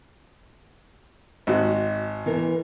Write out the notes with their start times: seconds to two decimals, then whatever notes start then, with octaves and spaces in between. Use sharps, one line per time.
1.47 G#1 F#4
2.26 E3 B3 A#4